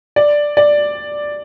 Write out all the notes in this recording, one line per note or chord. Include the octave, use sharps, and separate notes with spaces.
D5
D5